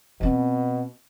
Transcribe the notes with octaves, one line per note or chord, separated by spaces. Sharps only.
B2 C4 C#4